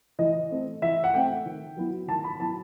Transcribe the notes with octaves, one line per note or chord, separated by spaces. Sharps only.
E3 D#5
A3 C4
E3 E5
F#5
A3 C4 G5
D#3
F#3 B3 E4
D#3 A5
B5
F#3 B3 E4 A5